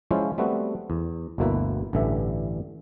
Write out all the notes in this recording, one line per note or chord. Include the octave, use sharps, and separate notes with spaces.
F3 G#3 C#4 E4 F4 C5
G3 A3 B3 C4 F#4
E2
G1 D2 B2 A#3 E4 B4
A1 G2 D3 E3 E5